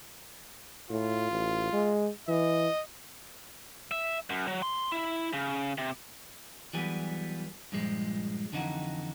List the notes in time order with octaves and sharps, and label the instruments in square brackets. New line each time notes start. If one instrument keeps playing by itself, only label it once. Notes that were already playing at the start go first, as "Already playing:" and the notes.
[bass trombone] A2 [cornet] F4
[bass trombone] A1
G#3
[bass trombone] E3 [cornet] D#5
[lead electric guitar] E5
F#2
F#3
C6
E4
C#3
C3
[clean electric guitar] E3 F#3 G3 B3 G#4
G2 A#2 F3 G#3
F2 D3 E3 D#4 E4 F#4